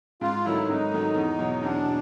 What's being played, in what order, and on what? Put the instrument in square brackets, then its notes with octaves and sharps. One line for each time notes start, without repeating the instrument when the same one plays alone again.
[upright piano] G#2 [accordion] F4
[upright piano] D#3 F#3 A3 [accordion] E4
[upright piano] G#2 [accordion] D#4
[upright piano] D#3 F#3 A3
E2
B2 F#3
[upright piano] E2 [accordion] D4
[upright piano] B2